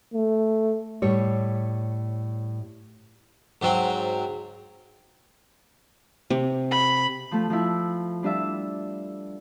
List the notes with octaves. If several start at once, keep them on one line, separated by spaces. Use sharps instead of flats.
A3
A2 G3 C#5
G#2 F#3 C4
C3
B5
F3 A3
F3 E4
G3 D4 F4 E5